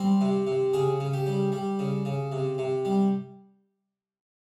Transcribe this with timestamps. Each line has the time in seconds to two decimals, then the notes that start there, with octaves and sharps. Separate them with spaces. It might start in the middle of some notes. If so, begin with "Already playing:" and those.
Already playing: G3 C4
0.21 C3
0.47 C3
0.73 C#3 G#4
1.00 C#3
1.13 G4
1.26 G3
1.52 G3
1.79 C#3
2.05 C#3
2.32 C3
2.58 C3
2.85 G3